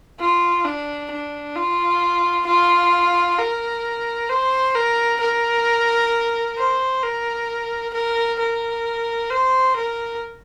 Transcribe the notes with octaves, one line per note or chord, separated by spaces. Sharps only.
F4
D4
D4
F4
F4
A#4
C5
A#4
A#4
C5
A#4
A#4
A#4
C5
A#4